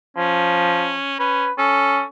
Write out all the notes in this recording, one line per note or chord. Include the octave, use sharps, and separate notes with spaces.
F3 C#4
C#4 B4
C#4 A4